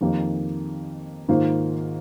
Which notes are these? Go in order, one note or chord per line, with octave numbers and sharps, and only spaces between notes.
F2 D#3 A#3 D#4 G4
G#2 D#3 A#3 F4 C5